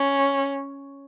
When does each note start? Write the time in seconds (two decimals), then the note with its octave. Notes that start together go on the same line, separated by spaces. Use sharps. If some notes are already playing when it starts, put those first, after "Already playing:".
Already playing: C#4